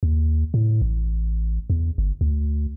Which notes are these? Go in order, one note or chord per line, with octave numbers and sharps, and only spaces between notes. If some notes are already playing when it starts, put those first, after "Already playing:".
D#2
A2
A1
E2
G1
D2